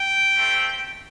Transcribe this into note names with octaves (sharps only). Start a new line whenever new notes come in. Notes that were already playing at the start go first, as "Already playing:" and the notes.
Already playing: G5
A3 C4 G4